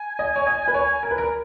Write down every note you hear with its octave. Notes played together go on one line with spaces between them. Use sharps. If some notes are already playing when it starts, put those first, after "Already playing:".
Already playing: G#5
D#5
C#5
D#5
B4
C#5
A#4
B4
A#4